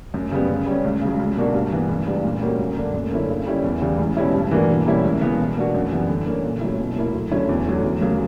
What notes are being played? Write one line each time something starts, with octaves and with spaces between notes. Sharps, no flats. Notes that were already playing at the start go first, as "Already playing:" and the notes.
F#2
C#3 G3 B3
C#3
G3 C#4
C#2
C#3 F#3
C#2
B2 A#3 D4 F#4
G2
E3 B3
C#2
C#3 G3 B3 D4
A#2
G3 A#3 C#4 F#4
F#2
D3 A#3 D4
F#2
D3 A#3 C#4 E4
C#3
G3 C#4 E4
E2
C#3 E3 G3
C#2
B2 G3 C#4 E4
G2
E3 A#3 D4 F#4
B2
G3 A#3 C#4 E4
C#2
C#3 E3 B3
B2
A#3 D4 F#4
F#2
E3 G3 B3
D3
A#3 C#4
A#2
F#3 C#4 E4
B2
F#3 A#3 E4
D2
D3 F#3 C#4 E4
E2
D3 F#3 C#4
E2
C#3 F#3 A#3